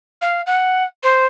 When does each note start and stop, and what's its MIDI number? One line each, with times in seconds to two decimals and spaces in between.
0.21 0.41 77
0.46 0.84 78
1.03 1.26 72